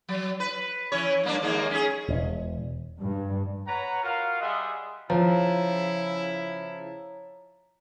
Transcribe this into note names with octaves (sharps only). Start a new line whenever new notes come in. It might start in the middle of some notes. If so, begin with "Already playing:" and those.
F#3
B4
E3 C#4 C#5
G2 A#3 D4
D#2 G#3 A#3
C#4 G#4
E1
G2
B4 C#5 F#5 A#5
F4 F#4 A#4 F5
G3 G#4 D#5 E5 F#5 C6
C#3 F3 E4 C#5 A#5